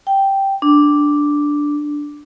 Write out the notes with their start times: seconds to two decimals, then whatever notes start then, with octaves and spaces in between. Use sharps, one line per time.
0.07 G5
0.62 D4